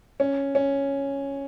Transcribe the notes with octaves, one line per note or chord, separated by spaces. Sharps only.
C#4
C#4